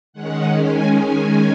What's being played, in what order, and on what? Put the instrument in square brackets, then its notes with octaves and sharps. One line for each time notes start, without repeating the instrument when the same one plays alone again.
[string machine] D#3 G#3 C#4 F#5
G#5
G#5